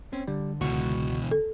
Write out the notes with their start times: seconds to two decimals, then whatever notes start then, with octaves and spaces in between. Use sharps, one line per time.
0.13 C4 C#4
0.28 D3 G3
0.61 C#2 B2 E3 F#4 C#6
1.31 A4